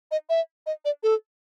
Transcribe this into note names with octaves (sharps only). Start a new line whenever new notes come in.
D#5
E5
D#5
D5
A4